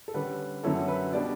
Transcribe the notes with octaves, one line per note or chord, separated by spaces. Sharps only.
A4
D3 G3 C#4 B4
F#2 D3 F#3 C#4 E4 A4
B4
B2 G3 D4 D5